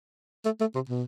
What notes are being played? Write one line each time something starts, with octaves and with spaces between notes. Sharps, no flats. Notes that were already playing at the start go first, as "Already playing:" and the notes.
A3
A3
C3
B2